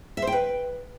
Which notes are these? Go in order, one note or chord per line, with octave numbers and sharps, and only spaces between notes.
E5
C5
G5
B4